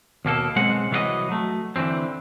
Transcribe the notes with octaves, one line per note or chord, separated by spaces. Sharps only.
D#2 B2 A#3 A4
B1 G#3 C4 F#5
C2 E3 F#3 F4 F#4 D#5
F#3 A3
D3 E3 F#3 C4